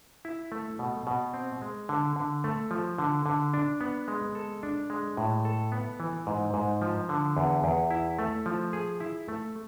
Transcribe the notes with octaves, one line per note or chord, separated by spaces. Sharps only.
E4
A3
B2
B2
C4
G#3
D3
D3
A3
F3
D3
D3
D4
B3
G#3
A4
D4
G#3
A2
A4
B3
E3
G#2
G#2
F3
D3
E2
E2
E4
A3
F3
G#4
E4
A3